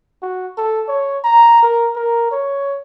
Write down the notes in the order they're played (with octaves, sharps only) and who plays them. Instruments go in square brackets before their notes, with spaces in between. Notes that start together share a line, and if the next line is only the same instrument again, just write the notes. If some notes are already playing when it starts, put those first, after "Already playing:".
[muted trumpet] F#4
A4
C#5
A#5
A#4
A#4
C#5